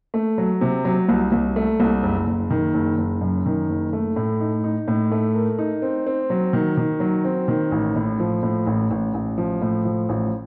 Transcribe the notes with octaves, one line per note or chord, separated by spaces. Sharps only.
A3
F#3
C3
F#3
C2
C2
A3
C2
F#1
F#1
D#3
F#1
F#1
F#2
D#3
F#1
A3
A2
D#4
D#4
A2
A3
A#4
D#4
C4
C4
F#3
D#3
D#3
F#3
C4
D#3
A1
A2
F3
A2
A1
A1
A1
F3
A2
F3
A1